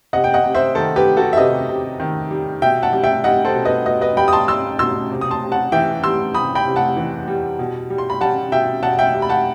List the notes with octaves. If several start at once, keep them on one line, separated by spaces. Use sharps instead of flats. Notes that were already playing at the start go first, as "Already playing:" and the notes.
C3 D#5 F#5
G5
D#5 F#5
C3
C5 E5
D#3 A4 C5
G4 B4
G3
F#4 A4
E5
C3 B4 D#5
C3
D#3
G3
B2 E5 G5
F#5 A5
G3
E5 G5
G3 D#5 F#5
A4 C5
B2
B4 D#5
B2 B4 D#5
B4 D#5
G3 G5 B5
D#6
A5 C6
G3 C6 E6
B2 C6 E6
C3
D#6
A5 C6
C3
F#5 A5
E3 E5 G5
G3 C6 E6
C3 B5 D#6
G5 B5
C3
F#5 A5
E3
G3
B2
G3
C6
B5
G3 F#5 A5
B2 E5 G5
B2 F#5 A5
E5 G5
G3
B5
F#5 A5